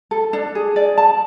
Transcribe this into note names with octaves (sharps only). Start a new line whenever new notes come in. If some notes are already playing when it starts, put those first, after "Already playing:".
A4
D4
G#4
D5
A5